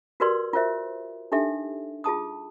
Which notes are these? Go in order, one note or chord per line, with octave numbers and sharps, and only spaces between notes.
F#4 G4 A#4 B4 D5 C6
F4 A#4 C5 E5
D4 D#4 G4 A4 E5
F4 G#4 A5 D#6